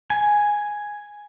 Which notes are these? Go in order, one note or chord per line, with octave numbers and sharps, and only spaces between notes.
G#5